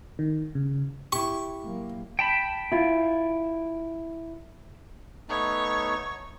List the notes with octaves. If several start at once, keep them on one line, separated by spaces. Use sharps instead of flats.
D#3
C#3
E4 G4 C#6
F#3 A#3
G5 A5 B5
E4 F4
A3 B3 D#4 C#5